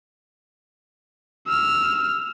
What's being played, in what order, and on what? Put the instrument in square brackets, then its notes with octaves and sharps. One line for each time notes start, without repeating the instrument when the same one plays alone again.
[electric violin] E6 F6